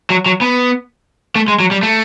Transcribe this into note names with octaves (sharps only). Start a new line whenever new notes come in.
F#3
F#3
B3
A3
G#3
F#3
G3
A3